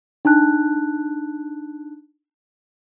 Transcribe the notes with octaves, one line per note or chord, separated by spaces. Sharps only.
D4 D#4 A5 F#6